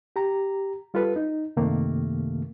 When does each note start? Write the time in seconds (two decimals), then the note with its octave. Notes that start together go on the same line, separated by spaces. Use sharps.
0.16 G4 A#5
0.94 G3 F4 A4 B4
1.16 D#4
1.57 F#2 C3 D#3 A3 A#3